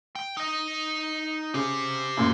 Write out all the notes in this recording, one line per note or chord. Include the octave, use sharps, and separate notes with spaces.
G5
D#4 D#5
C#3 G4 C5
F#2 A#2